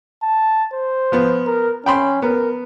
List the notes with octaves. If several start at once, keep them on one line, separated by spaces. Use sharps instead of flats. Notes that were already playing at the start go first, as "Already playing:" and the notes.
A5
C5
F3 B3
A#4
C#4 G5 B5 C6
B3 A#4